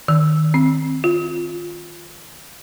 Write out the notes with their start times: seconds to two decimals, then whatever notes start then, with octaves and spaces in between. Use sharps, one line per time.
0.08 D#3
0.54 C4
1.04 F4